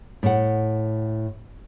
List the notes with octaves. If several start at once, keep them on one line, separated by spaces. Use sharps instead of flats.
A2 F#5